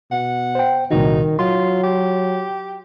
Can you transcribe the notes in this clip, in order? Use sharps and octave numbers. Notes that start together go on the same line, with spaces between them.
B2 F#5
C5 G5
C2 A#2 D#3 D#4 F#4
F#3 F4 C6
G4